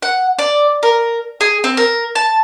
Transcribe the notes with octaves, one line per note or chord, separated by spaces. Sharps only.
F#5
D5
A#4
G#4
C4
A#4
A5